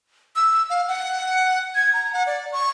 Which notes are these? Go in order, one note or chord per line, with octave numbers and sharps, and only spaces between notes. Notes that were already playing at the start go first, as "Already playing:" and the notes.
E6
F5
F#5
G#6
A#5
F#5
D5
C#6